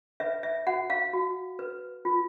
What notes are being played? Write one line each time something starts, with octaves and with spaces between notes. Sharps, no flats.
B4 E5
E5
F#4 F#5
F5
F#4
B4
F4